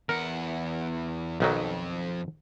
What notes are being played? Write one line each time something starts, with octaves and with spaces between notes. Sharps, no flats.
E2 A#4 F#5
B1 F2 D#3 F#3